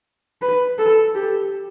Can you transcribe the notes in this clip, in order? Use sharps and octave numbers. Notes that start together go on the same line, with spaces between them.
B4
A4
G4